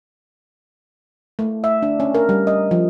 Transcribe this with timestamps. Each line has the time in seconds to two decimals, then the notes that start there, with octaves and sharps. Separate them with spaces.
1.39 A3
1.64 E5
1.83 D4
2.00 C#4
2.15 A#4
2.29 G3
2.47 D#5
2.71 F3